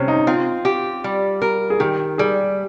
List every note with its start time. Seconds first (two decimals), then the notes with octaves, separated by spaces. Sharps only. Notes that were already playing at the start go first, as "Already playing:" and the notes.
Already playing: C3 G3 C4 C#4
0.08 D#4
0.27 C4 F4
0.65 G4
1.04 G3
1.42 A#4
1.70 G#4
1.80 D#3 G4
2.18 G3 G#4